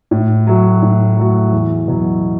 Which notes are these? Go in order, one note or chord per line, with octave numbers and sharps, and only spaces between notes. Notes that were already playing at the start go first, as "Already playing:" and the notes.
A2
F#3 A3 F#4
A2
F#3 A3 F#4
E2
B2 F#3